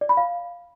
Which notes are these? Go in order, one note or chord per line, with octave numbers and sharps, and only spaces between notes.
D5
B5
F5